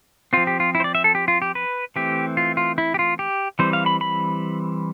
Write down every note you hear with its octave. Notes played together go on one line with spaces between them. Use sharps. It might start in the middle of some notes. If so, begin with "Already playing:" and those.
F3 C4 F4
G4
F4
E4
C5
D5
E5
A4
G4
F4
G4
B4
E3 A3 C4 G4
F4
F4
E4
G4
F4
G4
E3 G3 C4 C5
F5
B5
B5